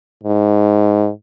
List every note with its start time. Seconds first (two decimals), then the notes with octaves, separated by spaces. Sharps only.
0.24 G#2